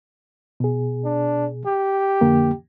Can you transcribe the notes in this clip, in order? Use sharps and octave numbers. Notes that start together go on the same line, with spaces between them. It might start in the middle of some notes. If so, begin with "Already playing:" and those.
B2 G#4
D4
G4
F2 D3 A#3